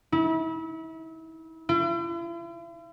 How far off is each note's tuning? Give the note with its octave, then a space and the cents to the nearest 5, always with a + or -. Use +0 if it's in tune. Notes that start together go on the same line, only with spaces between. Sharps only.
E4 -35
E4 +45